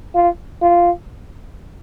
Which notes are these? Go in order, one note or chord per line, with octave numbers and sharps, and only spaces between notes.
F4
F4